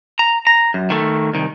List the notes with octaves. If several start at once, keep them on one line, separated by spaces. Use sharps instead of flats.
A#5
A#5
F#2
D#3 A3
C2 D#3